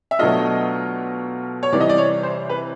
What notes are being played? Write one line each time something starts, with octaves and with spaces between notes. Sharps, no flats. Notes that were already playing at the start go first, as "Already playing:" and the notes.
E5
B2 F#3 A3 D4 F4 D#5
C#5
C3 E3 G3 D5
D#5
D5
C#5
C5
B4